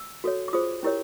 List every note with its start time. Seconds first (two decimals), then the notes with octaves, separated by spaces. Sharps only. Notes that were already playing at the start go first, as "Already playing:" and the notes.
Already playing: E6
0.24 F#4 A4 C#5
0.48 D6
0.53 F4 G#4 C5 D#6
0.83 C#4 E4 G4 A#4 C#5